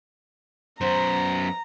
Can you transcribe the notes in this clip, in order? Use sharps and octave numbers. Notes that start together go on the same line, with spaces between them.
F#2 B3 C5 A#5